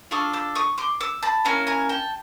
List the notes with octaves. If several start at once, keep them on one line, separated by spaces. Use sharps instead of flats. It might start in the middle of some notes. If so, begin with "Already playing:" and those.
D4 F4 A4 C#6 D#6
D6 E6
C#6 D#6
C6 D6
D6 E6
A5 B5
A#3 C#4 E4 G#5 A#5
G#5 A#5
G5 A5